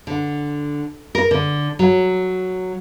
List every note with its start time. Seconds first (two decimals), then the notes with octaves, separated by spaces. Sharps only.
0.07 D3
1.15 A#4
1.31 D3
1.79 F#3